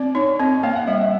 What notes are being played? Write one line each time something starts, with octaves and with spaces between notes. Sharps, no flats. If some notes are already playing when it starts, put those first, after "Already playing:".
Already playing: C4 D5
D#4 C#5
C4 D#5
A#3 F5
F#5
G3 E5
E5